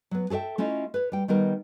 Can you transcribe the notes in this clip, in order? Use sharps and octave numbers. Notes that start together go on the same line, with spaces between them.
F#3 B3
G#4 A4 C#5 E5 G5
A3 C#4 E4 F4 D#5
B4 C#5
G3 G5
D#3 G3 B3 A#4